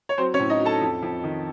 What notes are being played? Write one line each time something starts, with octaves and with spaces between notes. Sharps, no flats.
C#5
F#3 C4 C5
C#4 C#5
A2
D#4 D#5
F#3
A4 A5
F2
F2
D#3